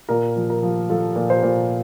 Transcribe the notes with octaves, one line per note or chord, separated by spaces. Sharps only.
A#2 A#4
F3
A#4
F3
F3 A4
A#2
C5
A#2